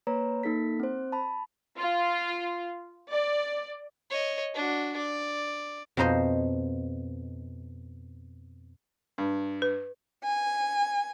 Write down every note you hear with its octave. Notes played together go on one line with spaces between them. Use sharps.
A#3 B4 C#5 A#5
A#3 D#4 A4 B6
C4 C5
A5 B5
F4
D5
C#5 D#5
D4 F#4
D5
F2 B2 D#4 C5 D#5
G2
B4
G#5